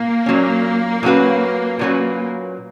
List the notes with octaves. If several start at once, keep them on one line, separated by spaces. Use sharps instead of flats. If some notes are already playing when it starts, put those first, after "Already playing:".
Already playing: A#2 A#3
A#2 F#3 C#4
A#2 F#3 C#4 F#4 B4
A#2 F#3 C#4 F#4 B4